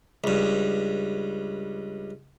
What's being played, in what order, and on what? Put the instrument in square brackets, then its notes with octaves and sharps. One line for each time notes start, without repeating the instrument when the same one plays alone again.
[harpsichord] C#2 G2